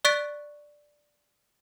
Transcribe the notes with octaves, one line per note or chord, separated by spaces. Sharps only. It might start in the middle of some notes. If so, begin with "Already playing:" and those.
D5 C#6 F#6 A6 B6 D7